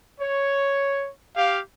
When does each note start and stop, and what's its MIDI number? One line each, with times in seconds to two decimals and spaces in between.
0.21 1.09 73
1.36 1.59 67
1.36 1.59 77